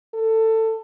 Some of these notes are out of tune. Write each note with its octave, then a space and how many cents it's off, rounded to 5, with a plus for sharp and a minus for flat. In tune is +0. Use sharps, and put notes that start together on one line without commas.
A4 +20